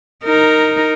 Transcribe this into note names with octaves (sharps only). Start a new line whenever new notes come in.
D#4 A#4